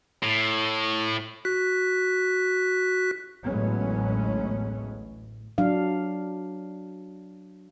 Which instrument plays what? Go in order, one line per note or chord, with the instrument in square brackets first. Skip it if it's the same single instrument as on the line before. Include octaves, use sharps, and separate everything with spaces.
[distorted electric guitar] A2
[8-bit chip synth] F#4 F#6 B6
[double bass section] A1 D2 F#3 G#3 B3 C#4
[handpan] F#3 D4 F5